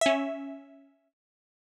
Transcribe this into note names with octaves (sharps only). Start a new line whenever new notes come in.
C#4 E5